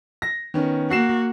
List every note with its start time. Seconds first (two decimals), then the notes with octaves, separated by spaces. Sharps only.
0.22 A#6
0.54 D#3 B3 C#4
0.90 A#3 F#4 F#5 C7 E7